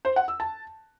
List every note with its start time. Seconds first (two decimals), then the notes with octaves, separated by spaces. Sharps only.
0.05 C5
0.16 F#5
0.28 E6
0.40 A5